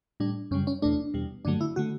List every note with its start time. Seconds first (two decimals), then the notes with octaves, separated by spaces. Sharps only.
0.20 A2 G3 D4
0.51 F#2 C#3 G3 C#4
0.67 C#4
0.82 E2 B2 A3 D4
1.14 E2 B2 G3
1.45 G2 D3 F#3 A3 D4
1.61 E4
1.76 D3 A3 F#4